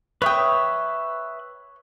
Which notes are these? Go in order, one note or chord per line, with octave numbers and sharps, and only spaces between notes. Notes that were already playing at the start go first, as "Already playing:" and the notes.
B4 C#5 E5 G5 D#6